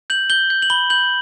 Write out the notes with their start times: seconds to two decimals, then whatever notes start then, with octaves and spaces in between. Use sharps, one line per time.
0.10 G6 F#7
0.30 G6 G7
0.50 G6
0.62 F#7
0.70 B5 G7
0.90 G6 F#7